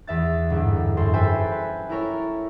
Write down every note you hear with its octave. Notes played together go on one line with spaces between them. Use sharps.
E2 E5 A6
G1 G#2 E5
F#2 A4 C6
A4 B4 C5 E5 G5 G#5
B4
E4 A4 A#4 C#5